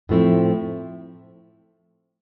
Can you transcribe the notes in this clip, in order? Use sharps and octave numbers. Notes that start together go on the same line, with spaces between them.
A2 F3 A3 C4 E4